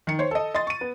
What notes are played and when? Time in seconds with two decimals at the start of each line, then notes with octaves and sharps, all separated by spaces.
0.07 D#3 C#7
0.19 C5 C#5
0.31 A4 D#5
0.54 D#5 C6 A6
0.67 C#6 D#7
0.81 B3